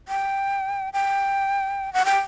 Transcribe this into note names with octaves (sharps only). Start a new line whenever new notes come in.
G5
G5
F#5
G5